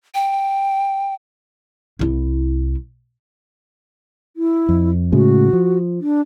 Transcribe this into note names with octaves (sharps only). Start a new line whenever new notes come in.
G5
C2 E4
E4
F2
A2 C#3 G#3 F#4
F3
D4